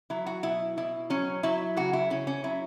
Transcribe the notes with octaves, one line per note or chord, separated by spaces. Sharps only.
F#3 E4
F#4
B2 E4
B2 E4
F#3 C#4
F#3 E4
C#3 F#4
E4
C#3 C#4
C#4
F#3 E4